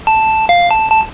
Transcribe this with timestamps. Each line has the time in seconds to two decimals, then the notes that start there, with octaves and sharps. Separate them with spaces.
0.07 A5
0.49 F5
0.71 A5
0.91 A5